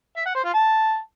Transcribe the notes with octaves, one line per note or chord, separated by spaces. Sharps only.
E5
F#5
C5
F4
A5